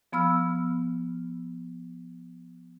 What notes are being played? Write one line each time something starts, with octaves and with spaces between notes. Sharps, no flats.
F3 B3 B5 E6 F6